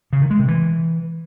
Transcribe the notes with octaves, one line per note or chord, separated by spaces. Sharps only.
C#3
D#3
G#3
C3
E3